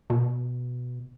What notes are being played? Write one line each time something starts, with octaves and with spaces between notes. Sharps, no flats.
B2